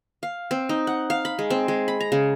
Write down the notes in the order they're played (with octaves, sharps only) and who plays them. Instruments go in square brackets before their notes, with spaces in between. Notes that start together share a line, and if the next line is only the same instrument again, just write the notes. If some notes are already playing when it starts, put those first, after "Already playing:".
[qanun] F5
C4
D#4
F#5
F5
B5
G#3
C4
G#3
B5
A#5
C#3